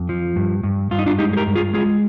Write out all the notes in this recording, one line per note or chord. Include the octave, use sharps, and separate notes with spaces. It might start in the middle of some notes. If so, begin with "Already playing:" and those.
Already playing: F2
F3
G2
G2
G2 F4
D#4
D4 F4
G#3 D#4 G4
G#4
G4 A#4
G2
F4 G#4
G#3 F4 G#4